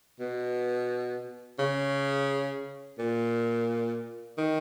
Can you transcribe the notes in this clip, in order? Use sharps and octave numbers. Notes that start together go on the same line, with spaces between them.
B2
C#3
A#2
D#3